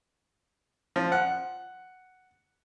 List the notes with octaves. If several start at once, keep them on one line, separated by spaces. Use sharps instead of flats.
F3
F#5